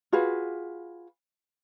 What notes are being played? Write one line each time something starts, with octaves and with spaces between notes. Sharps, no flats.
F4 F#4 G#4 B4